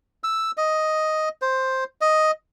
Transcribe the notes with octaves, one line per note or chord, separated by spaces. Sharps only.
E6
D#5
C5
D#5